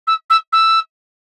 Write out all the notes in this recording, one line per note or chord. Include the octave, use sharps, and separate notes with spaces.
E6
E6
E6